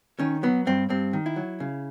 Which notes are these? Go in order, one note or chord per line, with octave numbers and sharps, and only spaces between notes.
D#3 C#4
F#3 B3
G2 C4
G2 C4
D#3
E4
F#3
C#3